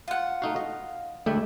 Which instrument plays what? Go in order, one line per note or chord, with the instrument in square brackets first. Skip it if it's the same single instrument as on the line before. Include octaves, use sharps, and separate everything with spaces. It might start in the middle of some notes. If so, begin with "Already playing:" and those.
[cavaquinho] F4 F#5
[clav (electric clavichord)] A3 D#4 F#4 [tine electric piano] F5
[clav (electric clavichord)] D#5
[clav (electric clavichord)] D2 D4 G5 [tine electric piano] G#3 E5 [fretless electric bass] A3